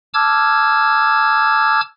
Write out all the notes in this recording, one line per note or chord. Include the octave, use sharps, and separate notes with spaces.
A5 D6 E6 F6 G#6